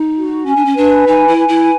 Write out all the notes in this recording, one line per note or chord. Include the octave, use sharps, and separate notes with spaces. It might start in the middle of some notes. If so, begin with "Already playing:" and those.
Already playing: D#4
F#4
C#4 G#5
D4
C#4
D4 B4
D#4 G#5
E4
B4
E4